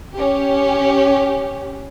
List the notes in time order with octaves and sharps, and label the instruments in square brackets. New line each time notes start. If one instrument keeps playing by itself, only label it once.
[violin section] C#4 G4